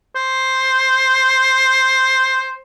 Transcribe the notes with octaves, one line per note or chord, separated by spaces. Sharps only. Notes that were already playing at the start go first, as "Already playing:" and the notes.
C5